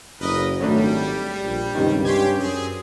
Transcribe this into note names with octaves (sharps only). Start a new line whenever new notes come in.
F#1 A#4 B4 D#5
G#1 F#3 G3 A3 D4
A#1
C#2 G2 C3 D#3
C#4 G4 C6 G#6
F#2 C4 G#4